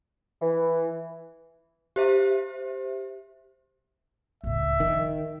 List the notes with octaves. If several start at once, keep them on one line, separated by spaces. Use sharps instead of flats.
E3
G4 C5 E5
C#2 A2 E5
D#3 F3